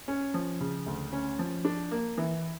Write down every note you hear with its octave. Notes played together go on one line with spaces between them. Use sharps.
C#4
F3
C#3
D2
C#4
F3
D4
A#3
E3